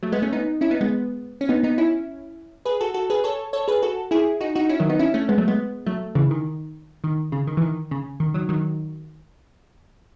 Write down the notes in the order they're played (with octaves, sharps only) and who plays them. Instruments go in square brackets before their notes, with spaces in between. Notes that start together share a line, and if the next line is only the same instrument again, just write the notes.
[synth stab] F#3 A3
G#3 B3
A3 C#4
B3 D#4
C#4 E4
B3 D#4
G#3 B3
C#4
B3 D#4
B3 D#4
C#4 E4
G#4 B4
F#4 A4
F#4 A4
G#4 B4
A4 C#5
A4 C#5
G#4 B4
F#4 A4
E4 G#4
D#4 F#4
D#4 F#4
C#4 E4
D#3 F#3
B3 D#4
C#4 E4
A3 C#4
G#3 B3
F#3 A3
G#3 B3
F#3 A3
C#3 E3
D#3
D#3
C#3
D#3
E3
D#3
C#3
D#3
D#3 F#3
D#3 F#3